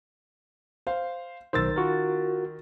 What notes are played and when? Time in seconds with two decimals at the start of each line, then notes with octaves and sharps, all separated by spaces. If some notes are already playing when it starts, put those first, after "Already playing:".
0.87 C5 F5
1.53 B1 D#3 C5 E6 A6
1.76 F4 F#4 A#4